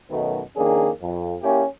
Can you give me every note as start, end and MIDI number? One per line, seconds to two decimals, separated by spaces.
0.11 0.42 35
0.11 0.42 42
0.11 0.42 47
0.11 0.42 51
0.11 0.42 57
0.11 0.42 71
0.57 0.89 41
0.57 0.89 51
0.57 0.89 58
0.57 0.89 61
0.57 0.89 62
0.57 0.89 68
1.02 1.34 41
1.42 1.64 58
1.42 1.64 61
1.42 1.64 64
1.42 1.64 67